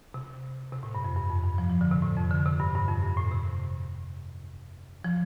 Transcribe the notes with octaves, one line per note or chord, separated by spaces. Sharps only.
C3
C3
A2
G2
F2
G2
F2
G2
F3
F3
D3
C3
A2
F2
D3
C3
G2
G2
F2
G2
A2
C3
F3